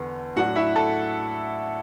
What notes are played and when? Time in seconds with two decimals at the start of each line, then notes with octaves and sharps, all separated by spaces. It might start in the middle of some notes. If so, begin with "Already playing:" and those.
Already playing: E2 D3 B3
0.36 A2 F#3 D4 F#4 F#5
0.56 E4 E5
0.76 A4 A5